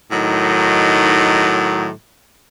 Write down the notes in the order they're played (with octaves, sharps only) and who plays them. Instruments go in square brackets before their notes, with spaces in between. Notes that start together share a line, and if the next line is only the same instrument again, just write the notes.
[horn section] A2 D#3 F#3 D#4